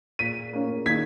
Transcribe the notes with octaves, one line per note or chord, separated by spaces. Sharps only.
A#2 B6 D#7
A#3 C#4
D#3 G#6 B6